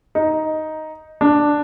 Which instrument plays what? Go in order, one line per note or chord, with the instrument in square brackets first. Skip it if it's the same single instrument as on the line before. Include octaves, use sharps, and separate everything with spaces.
[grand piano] D#4
D4